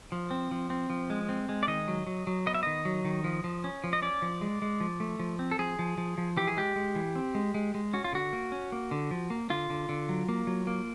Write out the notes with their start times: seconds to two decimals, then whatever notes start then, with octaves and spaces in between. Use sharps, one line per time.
0.12 F3
0.31 C4
0.51 F3
0.70 C4
0.90 F3
1.10 G#3
1.29 C4
1.49 G#3
1.63 D5
1.67 D#3 D#5
1.88 F#3
2.07 F#3
2.27 F#3
2.46 B3 D#5
2.55 E5
2.63 D#3 D#5
2.85 F#3
3.05 D#3
3.24 F3
3.44 F3
3.64 C#4
3.84 F3
3.93 D#5
4.02 C#4 D5
4.22 F3
4.41 G#3
4.62 G#3
4.80 F3
5.00 A3
5.20 F3
5.39 C4
5.51 A4
5.59 F3 G#4
5.79 F3
5.98 F3
6.18 F3
6.37 E3 G4
6.47 G#4
6.57 G#3 G4
6.76 G#3
6.95 E3
7.16 C4
7.35 G#3
7.54 G#3
7.74 G#3
7.93 C#4 F#4
8.04 F4
8.13 D3 F#4
8.33 A#3
8.52 C#4
8.72 A#3
8.91 D3
9.11 F3
9.30 A#3
9.50 D3 F4
9.70 D3
9.89 D3
10.09 F#3
10.29 A#3
10.47 F#3
10.67 A#3